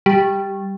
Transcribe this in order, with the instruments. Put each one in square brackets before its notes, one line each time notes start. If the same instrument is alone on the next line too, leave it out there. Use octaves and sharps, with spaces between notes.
[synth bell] G3